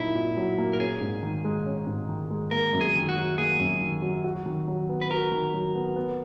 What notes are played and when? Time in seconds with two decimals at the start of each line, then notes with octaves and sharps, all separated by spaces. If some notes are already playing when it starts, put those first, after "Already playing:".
Already playing: A#2 F#3 A#3 D#4 E4
0.15 A#2
0.37 F#3
0.58 A#3
0.73 A#4
0.79 C#4 G#4
1.01 G#2
1.23 D#3
1.44 G#3
1.66 C#4
1.87 G#2
2.09 D#3
2.31 G#3
2.51 A#3 A#4
2.73 F#2
2.81 G#4
2.95 D#3
3.09 F#4
3.16 F#3
3.38 A#3 G#4
3.59 F#2
3.81 D#3
4.02 F#3
4.24 F#4
4.46 D#3
4.68 F#3
4.89 B3
5.01 B4
5.10 F#4 A#4
5.32 D#3
5.54 F#3
5.75 B3
5.96 B3